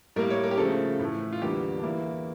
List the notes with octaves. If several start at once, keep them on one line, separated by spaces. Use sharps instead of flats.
A2 G3 A#3 A#4
C#5
A#4
G4
C#3 F3 A3 A4
A2 E3 A3
F4
E2 D3 G3 A#3 G4
D4
E2 E3 A#3 E4